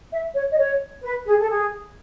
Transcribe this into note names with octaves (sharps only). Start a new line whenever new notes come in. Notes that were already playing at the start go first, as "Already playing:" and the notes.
E5
C#5
D#5
C#5
B4
G#4
A4
G#4